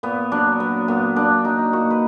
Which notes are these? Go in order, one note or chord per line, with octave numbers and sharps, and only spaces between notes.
A#2 B3
F#3 D4
F#3 B3
A#2 B3
A#2 D4
F#3 D#4
A#2 F#4
B4